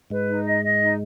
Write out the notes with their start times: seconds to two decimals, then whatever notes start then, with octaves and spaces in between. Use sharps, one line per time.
0.10 G#2 G#3 B4
0.28 D#4
0.46 D#5
0.63 D#5
0.81 D#4